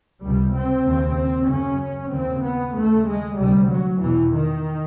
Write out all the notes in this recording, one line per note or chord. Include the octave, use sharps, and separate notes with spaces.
C#2 C3 G3
C4
D#2 C#3
F#2 C#3 C#4
D#2 C#3 C4
B3
D#2 C#3 A3
G#3
D2 C3 G3
F#3
E2 B2 E3
D#3